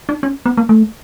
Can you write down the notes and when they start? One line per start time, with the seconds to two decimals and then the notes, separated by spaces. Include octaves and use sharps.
0.09 D4
0.23 C#4
0.46 B3
0.57 A#3
0.69 A3